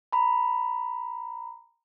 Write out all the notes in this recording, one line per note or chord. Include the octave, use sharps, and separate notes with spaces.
A#5 B5